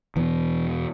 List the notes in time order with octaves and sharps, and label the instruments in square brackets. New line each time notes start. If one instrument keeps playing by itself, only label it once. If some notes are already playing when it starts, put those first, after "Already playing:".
[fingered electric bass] E2 B2 E3